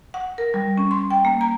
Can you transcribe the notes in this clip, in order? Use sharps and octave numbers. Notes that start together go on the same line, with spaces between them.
F#5
A#4
G3
C#4
C6
G5
A#3
A#5